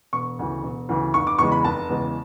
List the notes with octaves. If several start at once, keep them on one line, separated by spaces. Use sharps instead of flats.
E1 C#6
D2 C#3 E3
E1
D2 C#3 E3
F1 C#6
D6
E2 C#3 E3 G#3 C#6
B5
F1 A5
E2 C#3 E3 G#3